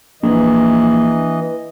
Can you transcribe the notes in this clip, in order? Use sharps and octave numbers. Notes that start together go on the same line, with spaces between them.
A#1 E3 D#5